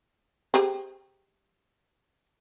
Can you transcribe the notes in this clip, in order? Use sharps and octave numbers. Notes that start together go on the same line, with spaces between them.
G4 G#4 C5